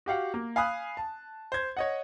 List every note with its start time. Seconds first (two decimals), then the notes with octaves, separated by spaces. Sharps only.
0.06 F#4 G4 F5 F#5
0.34 A#3
0.56 F5 G#5 B5 D#6 F#6
0.97 A5
1.52 C5 G#6
1.77 C#5 D#5 F#5